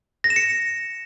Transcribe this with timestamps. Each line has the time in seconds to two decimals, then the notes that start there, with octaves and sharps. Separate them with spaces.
0.24 A#6
0.30 E7
0.36 C#7